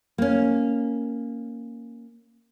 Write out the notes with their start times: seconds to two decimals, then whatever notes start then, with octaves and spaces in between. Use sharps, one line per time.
0.18 A#3 C#4